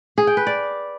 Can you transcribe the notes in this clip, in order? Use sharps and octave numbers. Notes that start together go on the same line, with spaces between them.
G#4
G5
B4
D5